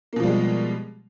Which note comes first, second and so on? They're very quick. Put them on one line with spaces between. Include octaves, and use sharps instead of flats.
A#3 B2 F3 G3 G#3